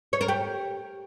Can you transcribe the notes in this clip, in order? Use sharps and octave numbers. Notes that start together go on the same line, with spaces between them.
C#5
A#4
G4